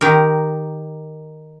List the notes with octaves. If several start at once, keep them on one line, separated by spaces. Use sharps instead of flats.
D#3 G4 A#4